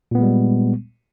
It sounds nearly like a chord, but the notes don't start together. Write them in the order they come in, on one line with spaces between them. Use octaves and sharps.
A#2 B3 G#3 G3